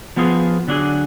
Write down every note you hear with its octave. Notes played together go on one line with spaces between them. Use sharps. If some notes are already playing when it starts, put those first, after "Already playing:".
F3 B3 F4 G#4
D3 F#3 D4 G#4